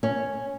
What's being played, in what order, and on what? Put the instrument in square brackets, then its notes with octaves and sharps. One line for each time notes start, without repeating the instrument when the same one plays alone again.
[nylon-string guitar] C#4